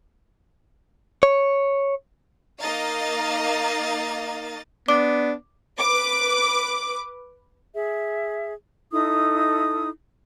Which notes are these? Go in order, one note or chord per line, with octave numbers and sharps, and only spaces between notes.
C#5
A#3 D#4 D#5 F5 A#5 A6
B3 D4 D6
B4 D6
G#4 E5
D#4 E4 A4 D#6